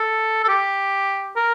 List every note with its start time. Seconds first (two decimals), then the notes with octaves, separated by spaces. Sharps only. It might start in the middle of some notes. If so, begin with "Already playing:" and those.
Already playing: A4
0.44 A4
0.48 G4
1.36 A#4